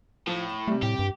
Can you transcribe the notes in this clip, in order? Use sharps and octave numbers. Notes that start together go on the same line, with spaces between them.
A2 F3
E7
C3 G3 A3
A2 G4
G2